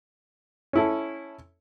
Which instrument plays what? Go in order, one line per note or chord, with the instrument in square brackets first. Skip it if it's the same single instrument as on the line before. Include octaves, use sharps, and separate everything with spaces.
[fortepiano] C#4 E4 A4